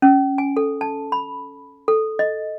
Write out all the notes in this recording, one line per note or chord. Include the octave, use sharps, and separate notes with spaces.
C#4
G#5
A4
A5
B5
A4
D#5